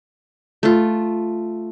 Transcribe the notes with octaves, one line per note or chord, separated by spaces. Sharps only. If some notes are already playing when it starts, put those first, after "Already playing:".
A3 F4